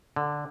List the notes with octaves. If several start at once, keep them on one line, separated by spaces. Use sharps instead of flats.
D3